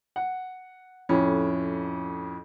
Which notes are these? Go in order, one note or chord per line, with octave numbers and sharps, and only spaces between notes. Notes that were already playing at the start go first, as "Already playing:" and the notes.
F#5
F2 A2 C#4